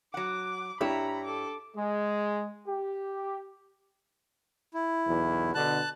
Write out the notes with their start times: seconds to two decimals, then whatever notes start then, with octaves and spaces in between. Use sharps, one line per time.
0.14 F#3 F#5 D6
0.81 G2 D4 E4 G4 C#5 A#5 B5
1.25 A4 D6
1.77 G#3
2.67 G4
4.74 E4
5.07 B1 E2
5.55 B2 D3 A5 F#6